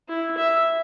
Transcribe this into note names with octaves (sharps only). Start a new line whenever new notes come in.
E4
E5